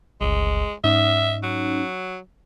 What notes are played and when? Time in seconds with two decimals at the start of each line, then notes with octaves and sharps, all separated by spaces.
0.21 G1 C#2 G#3
0.84 G#2 C#4 D#4 E5
1.43 F#3